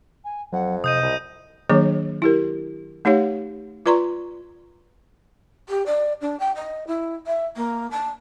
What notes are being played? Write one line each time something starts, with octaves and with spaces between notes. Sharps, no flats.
G#5
F2 F#3 F#5
C3 D#5 D#6 G6 D#7
C2
D#3 F#3 A#3 D4 G#4 C#5
E4 G4 A#4
A3 D#4 G4 C#5 F5
F4 B4 D5 A#5 C6 C#6
G4
D5
D4
G5
D#5
E4
E5
A#3
A5